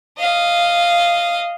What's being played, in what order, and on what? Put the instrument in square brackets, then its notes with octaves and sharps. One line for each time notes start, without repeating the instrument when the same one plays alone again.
[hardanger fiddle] D#5 F5